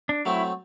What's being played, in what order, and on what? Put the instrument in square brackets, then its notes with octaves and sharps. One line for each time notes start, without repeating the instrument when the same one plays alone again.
[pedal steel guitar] D4
[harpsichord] F#3 A3 C4 [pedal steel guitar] E4